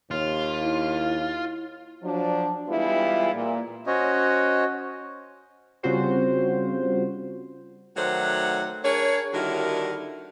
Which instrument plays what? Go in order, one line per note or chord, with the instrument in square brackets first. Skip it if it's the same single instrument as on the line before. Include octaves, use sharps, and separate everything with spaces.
[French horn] D#2 [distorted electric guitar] F4
[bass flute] E4
[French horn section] F3 F#3 D4
E3 G3 G#3 B3 E4 F4
A#2
[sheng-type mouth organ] C#4 F#4 C5 C#5 D#5
[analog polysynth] C#3 G3 C4 F4 F#4 C5
[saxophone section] D#3 F#3 A3 C5 D5 F#5
D4 G#4 A#4 C#5
D3 D#3 G3 E4 F#4 A#4